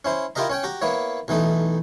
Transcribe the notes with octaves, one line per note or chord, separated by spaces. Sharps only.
C#4 E4 C5
E4 F4 G4 A#4 D#5 A#5
C#4 C#5 G5
F#4 G4 A#5
A#3 B3 E4 C#5
B1 E3 A3 D#4